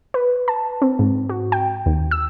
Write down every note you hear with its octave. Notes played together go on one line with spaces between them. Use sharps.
B4
A5
C4
G#2
F#4
G5
D#2
E6